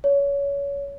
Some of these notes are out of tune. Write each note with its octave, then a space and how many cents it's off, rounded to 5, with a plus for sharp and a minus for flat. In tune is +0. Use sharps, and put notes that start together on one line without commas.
C#5 +25